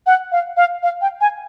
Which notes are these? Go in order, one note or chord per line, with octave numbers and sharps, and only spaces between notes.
F#5
F5
F5
F5
G5
G#5